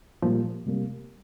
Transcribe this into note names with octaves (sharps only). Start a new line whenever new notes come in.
A#2 F3 G3 A#3
C3 G3 A#3